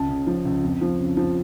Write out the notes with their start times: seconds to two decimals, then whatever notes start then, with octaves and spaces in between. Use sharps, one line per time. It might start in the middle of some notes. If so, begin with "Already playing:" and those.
Already playing: C#2 A5
0.09 C#3
0.27 F3
0.45 C#2
0.64 F2
0.81 F3
0.99 C#3
1.17 F3